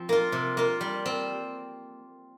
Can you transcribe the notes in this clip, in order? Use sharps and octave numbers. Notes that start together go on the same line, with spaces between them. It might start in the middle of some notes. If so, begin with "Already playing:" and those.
Already playing: F3 C4
A#3 F4
C3
A#3 F4
G3
C4